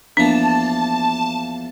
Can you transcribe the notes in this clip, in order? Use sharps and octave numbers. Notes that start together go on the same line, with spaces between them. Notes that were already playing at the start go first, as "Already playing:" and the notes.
E2 F3 A#3 D4 A5